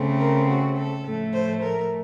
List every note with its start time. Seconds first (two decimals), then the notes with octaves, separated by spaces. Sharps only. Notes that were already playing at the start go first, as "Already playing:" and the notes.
Already playing: C#3 A3 C4
0.19 A#4
0.49 F#4
0.77 A4
1.04 A2 F3 A3
1.33 C5
1.62 A#4